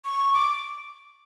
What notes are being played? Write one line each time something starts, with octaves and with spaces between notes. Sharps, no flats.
C#6
D6